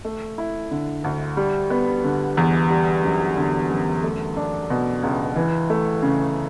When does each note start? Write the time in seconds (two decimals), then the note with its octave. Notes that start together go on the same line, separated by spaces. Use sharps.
0.05 A3
0.38 E4
0.71 D3
1.04 D2
1.37 G3
1.70 B3
2.04 D3
2.37 E2
2.70 G3
3.04 F#2
3.37 D3
3.70 F#2
4.03 A3
4.37 D4
4.70 B2
5.03 C#2
5.36 E3
5.70 A3
6.02 C#3